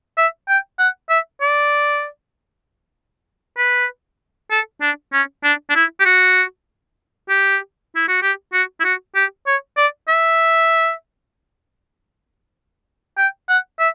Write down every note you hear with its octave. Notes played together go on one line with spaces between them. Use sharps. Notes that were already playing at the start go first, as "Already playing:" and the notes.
E5
G5
F#5
E5
D5
B4
A4
D4
C#4
D4
D4
E4
G4
F#4
G4
E4
F#4
G4
F#4
E4
F#4
G4
C#5
D5
E5
G5
F#5
E5